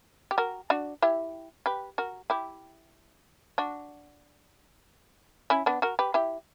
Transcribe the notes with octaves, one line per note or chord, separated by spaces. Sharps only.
G4
F#4 A#4
D4 F#4
E4 G4
G4 B4
F#4 A#4
E4 G4
D4 F#4
C#4 E4
B3 D4
F#4 A#4
G4 B4
E4 G4